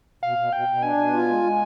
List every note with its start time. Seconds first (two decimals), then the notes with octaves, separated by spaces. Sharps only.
0.23 B2 F5
0.38 B2
0.53 B2 G5
0.68 B2
0.83 D4 G#5
0.98 B2
1.13 F4
1.28 G#3
1.43 G#3